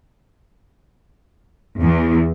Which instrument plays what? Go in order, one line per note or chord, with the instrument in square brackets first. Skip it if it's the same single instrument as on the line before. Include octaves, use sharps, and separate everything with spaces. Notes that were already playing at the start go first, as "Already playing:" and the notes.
[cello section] E2